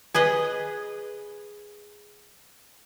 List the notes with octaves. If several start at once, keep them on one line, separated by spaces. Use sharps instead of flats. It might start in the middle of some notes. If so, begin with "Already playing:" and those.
G#4 B4 D#5